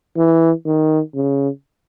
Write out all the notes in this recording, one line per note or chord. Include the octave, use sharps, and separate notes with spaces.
E3
D#3
C#3